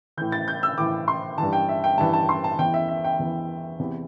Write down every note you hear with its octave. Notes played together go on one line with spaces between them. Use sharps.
A2 E3 G6
A6
G6
E6
A2 E3 D6
C6
G2 E3 A5
G5
E5
G5
G2 E3 A5
A5
C6
A5
E2 E3 G5
E5
E5
G5
E2 E3
E2 C3 E3